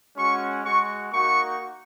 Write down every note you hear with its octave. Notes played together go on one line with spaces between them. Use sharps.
G#3 C#4 F#4 C#6
G#3 F#4 C#6
A#3 D#4 F#4 C#6